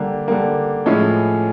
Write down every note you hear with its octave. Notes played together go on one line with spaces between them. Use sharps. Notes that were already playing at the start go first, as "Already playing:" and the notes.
Already playing: D3 G3 A#3
D3 G3 A#3
A2 F3 G#3 C#4 E4